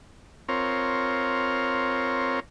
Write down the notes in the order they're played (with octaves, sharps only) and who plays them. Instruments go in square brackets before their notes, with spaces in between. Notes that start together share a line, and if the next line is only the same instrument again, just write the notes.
[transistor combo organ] C4 F4 A#4 C#5